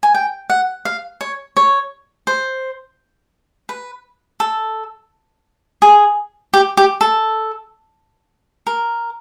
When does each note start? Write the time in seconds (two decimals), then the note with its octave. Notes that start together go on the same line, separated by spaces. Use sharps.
0.03 G#5
0.14 G5
0.50 F#5
0.85 F5
1.21 C#5
1.57 C#5
2.27 C5
3.69 B4
4.40 A4
5.82 G#4
6.54 G4
6.77 G4
7.01 A4
8.67 A#4